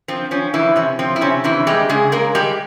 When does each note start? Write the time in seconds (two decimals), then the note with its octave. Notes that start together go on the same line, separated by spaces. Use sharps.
0.08 F3 C4
0.31 F3 C#4
0.54 E3 F3 E4
0.76 C3 C#4
0.99 F3 C4
1.16 E4
1.21 C3 C#4
1.44 C3 E3 E4
1.67 G3 G#3 G4
1.89 C#3 G#3 G#4
2.12 G#3 A#3 A#4
2.35 G3 G#3 G4